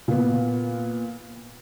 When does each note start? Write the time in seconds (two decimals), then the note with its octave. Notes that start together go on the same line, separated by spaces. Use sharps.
0.08 A#2 B3